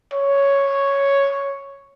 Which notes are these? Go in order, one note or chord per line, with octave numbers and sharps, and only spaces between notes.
C#5